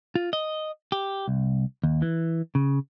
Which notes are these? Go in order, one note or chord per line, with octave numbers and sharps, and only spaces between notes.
F4
D#5
G4
C2
D#2
E3
C#3